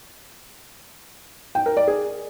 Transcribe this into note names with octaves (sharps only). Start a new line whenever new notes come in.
G5
A#4
D5
G#4